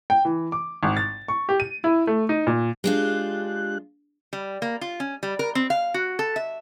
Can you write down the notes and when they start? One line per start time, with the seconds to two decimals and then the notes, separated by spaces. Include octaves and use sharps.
0.10 G5
0.25 E3
0.52 D6
0.83 G#1
0.97 A6
1.28 C#6
1.49 G4
1.60 D#7
1.84 E4
2.07 A3
2.29 D#4
2.47 A#2
2.84 G#3 D4 F4 G4 F#6
4.33 G3
4.62 A#3
4.81 F4
5.00 C#4
5.23 G3
5.39 A#4
5.55 C4
5.70 F5
5.94 F#4
6.19 A4
6.36 E5